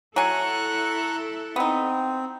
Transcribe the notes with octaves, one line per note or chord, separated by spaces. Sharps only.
F#3 E4 A4 G#5 A#5 C#6 F#6
B3 C4 D#4